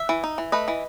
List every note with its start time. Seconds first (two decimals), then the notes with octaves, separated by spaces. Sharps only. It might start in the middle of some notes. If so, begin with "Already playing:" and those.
Already playing: E5
0.09 E3
0.24 D#4
0.38 E3
0.52 A3 B4 D#5
0.68 E3